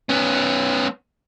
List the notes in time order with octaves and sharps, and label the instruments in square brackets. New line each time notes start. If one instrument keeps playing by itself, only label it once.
[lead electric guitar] B3 C#4